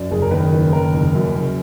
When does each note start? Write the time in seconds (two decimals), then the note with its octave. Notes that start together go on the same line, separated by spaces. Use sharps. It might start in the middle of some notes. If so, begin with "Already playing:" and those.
Already playing: F#2 D5
0.11 F#1 G#4
0.22 A#4
0.31 D#3 B4
0.52 F#1
0.73 D#3 A#4
0.94 F#1
1.14 F#2
1.35 F#1